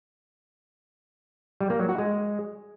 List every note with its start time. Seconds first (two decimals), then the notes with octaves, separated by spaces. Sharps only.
1.61 G3
1.70 A#3
1.79 F#3
1.89 F#4
1.98 G#3